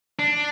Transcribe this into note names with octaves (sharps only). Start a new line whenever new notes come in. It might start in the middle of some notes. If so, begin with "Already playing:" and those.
D4